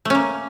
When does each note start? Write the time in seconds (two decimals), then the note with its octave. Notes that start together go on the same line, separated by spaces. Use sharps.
0.05 A3
0.10 C#4
0.15 A#3